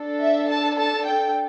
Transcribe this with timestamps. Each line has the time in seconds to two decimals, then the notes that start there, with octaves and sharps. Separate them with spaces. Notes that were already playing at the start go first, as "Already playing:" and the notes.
Already playing: D4 A4
0.20 E5
0.48 A5
0.76 A5
1.04 G5